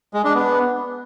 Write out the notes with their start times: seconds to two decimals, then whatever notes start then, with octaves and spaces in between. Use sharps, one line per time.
0.14 G#3
0.24 D4
0.35 B3